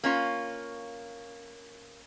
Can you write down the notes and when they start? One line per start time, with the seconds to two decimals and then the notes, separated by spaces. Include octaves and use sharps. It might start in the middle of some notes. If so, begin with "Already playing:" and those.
0.04 A#3 C#4 F4